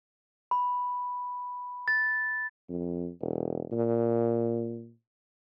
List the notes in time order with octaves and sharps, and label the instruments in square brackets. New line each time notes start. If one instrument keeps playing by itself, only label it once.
[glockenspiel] B5
A6
[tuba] F2
E1
A#2